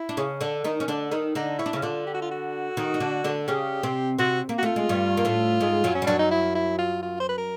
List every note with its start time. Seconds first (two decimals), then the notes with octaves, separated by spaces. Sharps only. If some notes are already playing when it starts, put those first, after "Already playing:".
Already playing: E4
0.09 D4
0.17 C#3 C#4
0.41 D3 D4
0.64 D#3 D#4
0.80 C#4
0.88 D3 D4
1.11 D#3 D#4
1.35 D3 D4 D#4
1.59 C#4 E4
1.66 D4
1.73 C#3 C#4
1.82 D3 D4 F4
2.07 G4
2.14 F#4
2.22 F4
2.31 F#4
2.77 D#3 D#4
2.94 D#4
3.00 D3 D4
3.24 D3 D4
3.48 C#3 C#4 G4
3.83 C3 C4
4.19 C3 C4 F#4
4.49 A#3
4.58 F#4
4.63 A3 F4
4.76 G#3
4.89 G2 G3
5.17 A#3
5.25 A2 A3
5.60 G#2 G#3
5.84 F#2 F#3
5.95 C#4
6.02 G3
6.07 F#2 F#3 D4
6.19 D#4
6.31 E4
6.55 E4
6.79 F4
7.03 F4
7.20 C5
7.29 B4
7.38 A#4